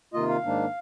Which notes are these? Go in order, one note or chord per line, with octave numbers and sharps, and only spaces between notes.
C3 D#3 A#3 F4 D#5
F5
G#2 D#3 A#3 D4